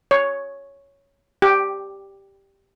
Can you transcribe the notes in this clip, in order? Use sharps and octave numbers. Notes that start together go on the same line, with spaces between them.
C#5
G4